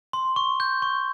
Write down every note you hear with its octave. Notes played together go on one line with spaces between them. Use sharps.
C6
C#6
G6
C#6